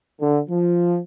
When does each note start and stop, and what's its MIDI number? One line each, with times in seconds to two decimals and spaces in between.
0.20 0.39 50
0.49 0.97 53